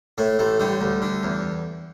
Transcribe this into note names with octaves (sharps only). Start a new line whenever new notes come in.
A2 A3
A1 A3
D3 G3
D2
D3
E2